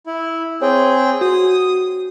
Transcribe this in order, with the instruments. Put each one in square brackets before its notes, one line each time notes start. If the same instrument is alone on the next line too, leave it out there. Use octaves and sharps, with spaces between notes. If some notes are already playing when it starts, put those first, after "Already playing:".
[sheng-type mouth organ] E4
[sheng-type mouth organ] C4 G#4 G5 [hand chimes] C#5
[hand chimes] F#4 [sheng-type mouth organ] D#6